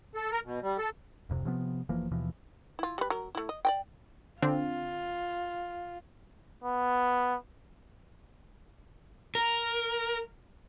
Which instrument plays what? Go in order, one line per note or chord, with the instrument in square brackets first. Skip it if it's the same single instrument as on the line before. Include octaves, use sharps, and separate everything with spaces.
[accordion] A4
A#4
B2
G3
A4
[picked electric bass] D1 F2 C3
C3 F3 B3
F1 E3 F3 A#3
D#2 B2 E3 F3
[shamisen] E4 F4
G3 B4
F#3 A#4
A3 E4
D#5
D5 D#5 G5
[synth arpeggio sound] D3 C4 D4 [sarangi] F4
[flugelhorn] B3
[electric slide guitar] A#4